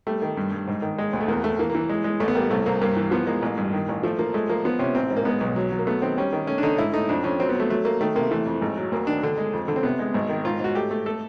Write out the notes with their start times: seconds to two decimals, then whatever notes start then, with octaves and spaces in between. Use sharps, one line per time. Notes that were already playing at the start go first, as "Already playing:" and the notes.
0.07 G3 A3
0.22 D#3
0.37 G2
0.52 G2
0.67 G#2
0.82 D#3
0.98 G#3
1.13 D2
1.21 A3
1.28 E2 A#3
1.44 E2 A3
1.59 E3 A#3
1.70 A#3
1.75 E3
1.89 G#3
2.04 G#3
2.20 A1 A3
2.28 B3
2.35 G3 A#3
2.50 C2 A3
2.66 C2 A#3
2.81 G2 A#3
2.97 E3
3.11 F3 B3
3.27 G#3 A#3
3.42 A1
3.57 G2
3.73 D#3
3.89 A1
4.03 F3 A3
4.19 F3 A#3
4.34 G#3 A3
4.49 F3 A#3
4.65 F3 B3
4.79 C3 C#4
4.95 A1 C4
5.11 G#2
5.17 A#3
5.25 G#3 B3
5.41 B1
5.56 F#3
5.72 F#3
5.79 A#3
5.87 A3 B3
6.02 D#3 C4
6.17 G3 C#4
6.33 D#3
6.47 A3 C#4
6.58 D4
6.63 D3 D#4
6.78 G#2 E4
6.93 A3 D#4
7.09 F2 D4
7.24 F2 C#4
7.39 F#3 C4
7.49 B3
7.55 F#3 A3
7.70 F#3 A3
7.85 A3 A#3
8.01 D#3 A3
8.15 C3 A#3
8.31 E3 A3
8.46 F2
8.61 G#1
8.77 F#3
8.92 D2 A#3
9.07 D#3 D4
9.23 D3
9.38 G#3
9.53 F2
9.68 D3
9.76 C4
9.83 C3 B3
9.99 G#3
10.14 G#1
10.29 D#3
10.45 G#2 F4
10.60 G#2 F#4
10.75 A3 G4
10.91 A3
11.06 A3 A4